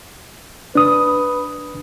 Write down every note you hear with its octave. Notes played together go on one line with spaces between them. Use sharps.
D4 B4 D#6